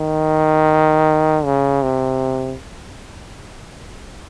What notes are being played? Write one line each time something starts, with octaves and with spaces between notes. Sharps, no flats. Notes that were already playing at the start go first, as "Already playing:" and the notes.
Already playing: D#3
C#3
C3